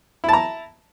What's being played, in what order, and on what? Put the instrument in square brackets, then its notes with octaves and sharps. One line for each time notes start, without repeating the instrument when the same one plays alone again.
[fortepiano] E4
A5
A#5